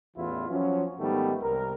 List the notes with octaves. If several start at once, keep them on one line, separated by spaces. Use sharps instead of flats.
A1 E2 E3 E4 F4
F3 F#3 C#4
G#2 D#3 G3 A3 B3
C2 A#4